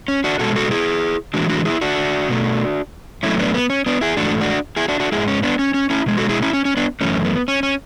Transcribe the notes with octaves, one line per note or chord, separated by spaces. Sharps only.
C#4
D4 F#4
B2 G#3 F#4 A4
F#4 A4
E4 G#4
A2 E3 G#3 D4 F#4
D4 F#4
E4 G#4
D4 F#4
B2 A3
A2 F#3 A3 C#4 E4
B3 D4
B3
C#4
B3 D4
E4 G#4
G#2 E3 A3 D4 F#4
D4 F#4
E4 G#4
D4 F#4
D4 F#4
G#2 G#3 E4 G#4
C#4
B3 D4
C#4
C#4
C#4 E4
B2 G#3
F#4 A4
E4 G#4
C#4 E4
C#4
C#4
B3 D4
F#2 E3 A3 C#4
B3
C#4
C#4